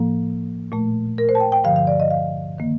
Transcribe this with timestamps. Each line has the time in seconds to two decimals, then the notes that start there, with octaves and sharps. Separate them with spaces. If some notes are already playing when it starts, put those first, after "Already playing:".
Already playing: A2 F3 A#3
0.72 A#2 A3
1.18 A#4
1.29 C5
1.35 A5
1.40 G5
1.52 G5
1.64 G2 D3 F3 F5
1.76 F5
1.87 D5
2.00 D#5
2.11 F5
2.58 D#3 A#3